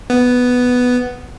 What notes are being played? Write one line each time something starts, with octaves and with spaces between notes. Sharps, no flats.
B3